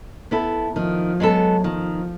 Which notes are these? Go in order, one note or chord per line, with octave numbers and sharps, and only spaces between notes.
B3 E4 A4
D#3 F3
F#3 G#3 B3 E4 A4
D#3 F3